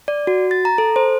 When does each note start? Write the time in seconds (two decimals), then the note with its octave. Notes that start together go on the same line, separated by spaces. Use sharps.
0.08 D5
0.27 F#4
0.51 A6
0.65 A#5
0.78 A4
0.96 C5